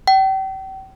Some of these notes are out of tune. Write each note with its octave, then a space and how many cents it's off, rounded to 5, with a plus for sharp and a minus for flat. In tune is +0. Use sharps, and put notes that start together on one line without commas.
G5 -35